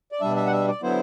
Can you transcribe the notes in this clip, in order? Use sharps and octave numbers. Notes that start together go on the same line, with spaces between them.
D5
B2 G3 D4 E5
E5
F#5
E5
D5
D3 F#3 B3 E4 C5